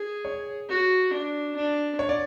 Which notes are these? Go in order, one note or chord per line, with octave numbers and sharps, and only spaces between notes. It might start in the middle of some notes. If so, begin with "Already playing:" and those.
Already playing: G#4
C#5
F#4
D4
D4
C#5
D5